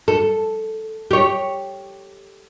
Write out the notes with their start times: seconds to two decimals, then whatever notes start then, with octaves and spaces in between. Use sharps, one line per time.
0.08 A4
1.11 G4 C#5